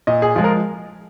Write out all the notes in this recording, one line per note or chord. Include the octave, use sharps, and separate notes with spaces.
A#2 D#5
G#4
F3 G#3 F4
A#4